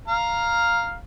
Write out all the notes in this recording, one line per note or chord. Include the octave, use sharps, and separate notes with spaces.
F5 A#5 F6